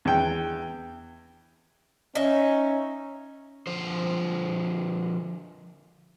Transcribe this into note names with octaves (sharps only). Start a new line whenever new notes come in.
E2 G5
C#4 D#4 E5
D3 F3 C5